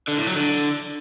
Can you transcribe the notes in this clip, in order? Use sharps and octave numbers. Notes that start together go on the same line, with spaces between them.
D3
A2
F#3
D3